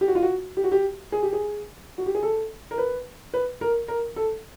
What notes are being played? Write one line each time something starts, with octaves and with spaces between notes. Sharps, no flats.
G4
F#4
F4
F#4
G4
F#4
G4
G#4
G4
G#4
F#4
G4
G#4
A4
A#4
B4
B4
A#4
A#4
A4